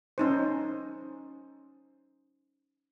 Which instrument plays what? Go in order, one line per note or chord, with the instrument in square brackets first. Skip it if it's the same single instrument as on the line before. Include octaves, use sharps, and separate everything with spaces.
[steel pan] C#4 D#4 C5